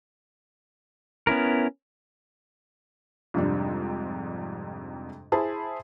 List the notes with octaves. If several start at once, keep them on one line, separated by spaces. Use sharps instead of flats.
B3 C#4 E4 A#4
F2 G#2 C3 G3 D4
E4 G#4 C5 A5 B5